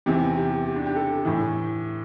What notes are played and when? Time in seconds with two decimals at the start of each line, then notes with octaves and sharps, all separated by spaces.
0.06 E2 C3 E3 G4
0.36 G4
0.65 G4
0.76 D4
0.86 G4
0.96 A4
1.25 A2 E3